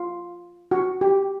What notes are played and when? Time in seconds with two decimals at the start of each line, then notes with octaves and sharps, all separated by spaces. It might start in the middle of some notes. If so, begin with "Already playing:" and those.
Already playing: F4
0.71 F#4
1.01 G4